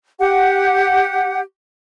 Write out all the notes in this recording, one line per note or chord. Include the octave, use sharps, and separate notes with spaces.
G4 F#5